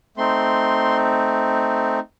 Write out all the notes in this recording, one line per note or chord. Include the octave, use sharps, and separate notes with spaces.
A3 C4 D#4 C6